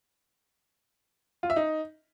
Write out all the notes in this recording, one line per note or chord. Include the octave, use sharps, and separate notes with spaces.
F4
E5
D#4